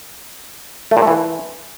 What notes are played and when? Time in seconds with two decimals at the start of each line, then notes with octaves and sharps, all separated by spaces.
0.91 A3
0.97 A#2
1.02 A3
1.07 E3